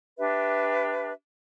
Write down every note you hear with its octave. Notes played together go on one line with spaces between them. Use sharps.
D4 G4 B4 E5